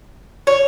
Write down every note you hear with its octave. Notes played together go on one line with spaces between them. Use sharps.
C#5